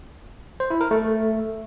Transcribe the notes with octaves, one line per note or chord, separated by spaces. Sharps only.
C5
E4
A#4
A3